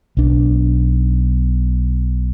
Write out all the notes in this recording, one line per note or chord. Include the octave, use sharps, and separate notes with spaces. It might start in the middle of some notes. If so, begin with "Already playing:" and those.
B1 D4